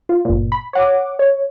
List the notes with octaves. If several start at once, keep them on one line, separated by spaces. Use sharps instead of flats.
F4
G1 A#2
B5
C#5 F#5 D6
C#5